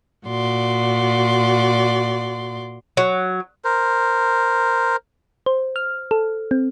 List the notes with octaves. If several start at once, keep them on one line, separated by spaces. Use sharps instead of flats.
A#2 F#4 D5 C6
F#3
A#4 C5
C5
F6
A4
C4